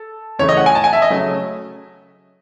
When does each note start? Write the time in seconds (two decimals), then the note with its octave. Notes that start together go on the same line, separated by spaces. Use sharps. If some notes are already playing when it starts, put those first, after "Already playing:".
Already playing: A4
0.39 F#2 C#3 E3 A3 C#5
0.49 D#5
0.57 F#5
0.66 G#5
0.75 A5
0.84 G#5
0.93 E5
1.02 D#5
1.10 C#3 F#3 A3